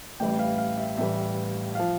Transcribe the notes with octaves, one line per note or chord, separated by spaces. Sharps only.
A1 A2 E3 G3 G5
F5
F5
E5
A1 A2 E3 G3 E5
F3 F5